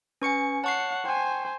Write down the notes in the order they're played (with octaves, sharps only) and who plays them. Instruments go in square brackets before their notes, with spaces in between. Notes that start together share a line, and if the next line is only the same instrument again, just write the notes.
[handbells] C#4 C#6 C#7 [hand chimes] B4 G#5
[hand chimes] C#5 [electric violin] F#5 [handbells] A5 C#6 C7
[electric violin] C5 G#5 [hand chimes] G5